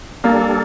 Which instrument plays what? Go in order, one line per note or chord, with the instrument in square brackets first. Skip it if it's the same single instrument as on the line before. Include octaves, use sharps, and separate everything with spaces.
[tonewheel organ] G3 D4 A4 [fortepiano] A#3